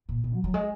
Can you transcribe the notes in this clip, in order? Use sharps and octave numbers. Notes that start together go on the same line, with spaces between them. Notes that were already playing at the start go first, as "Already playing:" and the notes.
A#2
A#2
F#3
F#3
G#3